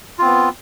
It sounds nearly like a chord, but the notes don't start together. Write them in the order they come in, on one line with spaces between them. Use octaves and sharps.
F4 C4 B3